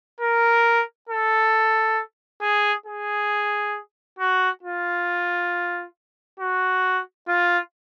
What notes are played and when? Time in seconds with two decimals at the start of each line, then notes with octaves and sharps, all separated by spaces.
0.20 A#4
1.09 A4
2.42 G#4
2.86 G#4
4.19 F#4
4.63 F4
6.40 F#4
7.28 F4